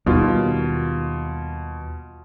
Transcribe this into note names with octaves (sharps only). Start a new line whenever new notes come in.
D#2 B2 D#3 G3 F4